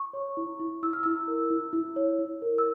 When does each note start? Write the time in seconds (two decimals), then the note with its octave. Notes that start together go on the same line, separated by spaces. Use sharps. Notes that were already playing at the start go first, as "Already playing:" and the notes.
Already playing: C#6
0.13 C#5
0.37 E4
0.59 E4
0.83 E4 E6
0.93 F6
1.03 E4 E6
1.28 A#4
1.50 E4
1.73 E4
1.96 C#5
2.19 E4
2.42 A#4
2.58 E6